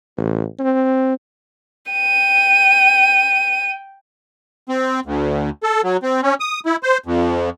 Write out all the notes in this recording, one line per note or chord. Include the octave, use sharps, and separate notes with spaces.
A1
C4
G5 D#7
C4
D2
A4
F#3
C4
C#4
D#6
E4
C5
F2